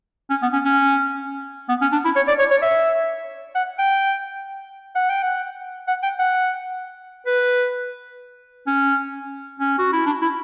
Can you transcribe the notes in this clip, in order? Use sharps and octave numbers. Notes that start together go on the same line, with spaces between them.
C#4
B3
C#4
C#4
B3
C#4
D4
E4
C#5
D5
C#5
C#5
E5
F#5
G5
F#5
G5
F#5
F#5
G5
F#5
B4
C#4
C#4
F#4
E4
D4
E4